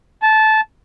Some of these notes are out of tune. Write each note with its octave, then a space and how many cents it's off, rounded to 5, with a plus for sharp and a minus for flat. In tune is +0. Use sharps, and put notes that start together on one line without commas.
A5 -15